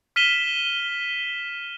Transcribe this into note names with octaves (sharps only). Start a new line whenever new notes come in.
F6 B6 D#7 E7 G7